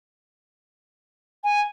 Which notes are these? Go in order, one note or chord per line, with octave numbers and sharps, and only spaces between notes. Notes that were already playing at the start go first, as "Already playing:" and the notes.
G#5